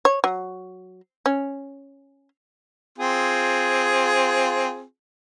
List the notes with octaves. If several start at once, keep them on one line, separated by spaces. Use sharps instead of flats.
C#5
F#3
C#4
C4 F4 G#4